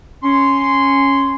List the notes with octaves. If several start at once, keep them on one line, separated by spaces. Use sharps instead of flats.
C#4 C6